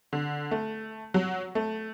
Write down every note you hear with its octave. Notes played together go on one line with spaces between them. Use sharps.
D3
A3
F#3
A3